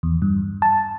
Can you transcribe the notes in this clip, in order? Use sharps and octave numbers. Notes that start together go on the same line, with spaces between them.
E2
G2
A5